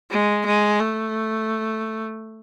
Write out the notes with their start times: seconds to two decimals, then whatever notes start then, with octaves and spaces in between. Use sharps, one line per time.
0.11 G#3
0.46 G#3
0.80 A3